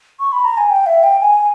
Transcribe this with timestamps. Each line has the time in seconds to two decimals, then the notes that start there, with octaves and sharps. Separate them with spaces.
0.20 C#6
0.32 B5
0.45 A#5
0.57 G#5
0.70 G5
0.86 E5
1.03 G5
1.20 G#5